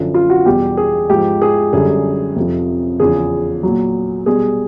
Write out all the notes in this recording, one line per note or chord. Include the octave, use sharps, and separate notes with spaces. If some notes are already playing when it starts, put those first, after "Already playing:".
Already playing: F#2 D3 F3
F4
F#4
E2 B2 G3 G4
G#4
G#2 F3 G4
G#4
F#2 D3 G3 G#4
F2 C3 F3
E2 C#3 F3 G#4
A#2 F#3
B2 G3 G#4